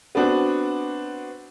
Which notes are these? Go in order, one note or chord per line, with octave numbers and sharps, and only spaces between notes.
B3 C4 D4 F#4